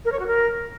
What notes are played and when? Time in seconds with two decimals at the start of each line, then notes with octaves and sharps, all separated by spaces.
0.05 A#4
0.12 C#5
0.19 F#4
0.27 A#4